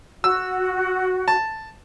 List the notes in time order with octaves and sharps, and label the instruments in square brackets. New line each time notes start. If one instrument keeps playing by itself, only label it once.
[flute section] F#4 [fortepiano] E6
[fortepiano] A5